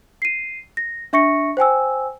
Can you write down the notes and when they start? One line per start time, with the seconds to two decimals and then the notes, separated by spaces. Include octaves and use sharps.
0.22 C7 D#7
0.77 A#6
1.13 D4 E5 C#6 A#6 C#7
1.57 C5 G5 G#5 E6